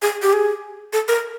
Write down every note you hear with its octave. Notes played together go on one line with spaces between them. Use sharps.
G#4
G4
G#4
A4
A#4